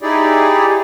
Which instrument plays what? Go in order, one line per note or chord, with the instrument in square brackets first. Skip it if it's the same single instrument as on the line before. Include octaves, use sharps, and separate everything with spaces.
[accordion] D#4 E4 G4 G#4 D5